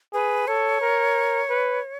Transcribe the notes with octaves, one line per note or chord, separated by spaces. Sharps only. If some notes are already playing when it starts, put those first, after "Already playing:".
G#4 B4
A4 C#5
A#4
B4